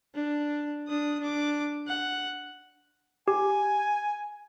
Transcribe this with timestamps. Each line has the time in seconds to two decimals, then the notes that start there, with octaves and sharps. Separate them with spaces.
0.15 D4
0.88 D4 D#6
1.20 D4 D6
1.88 F#5
3.28 G4 G#5